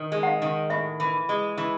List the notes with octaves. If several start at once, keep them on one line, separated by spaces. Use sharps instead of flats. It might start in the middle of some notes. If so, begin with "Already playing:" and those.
Already playing: D#3
G#3
F#5
F5
D#3
A2 E5
E3
G#3
E3